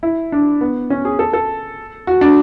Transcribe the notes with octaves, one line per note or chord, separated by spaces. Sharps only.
E4
D4
B3
C#4
G#4
A4
A4
F#4
D4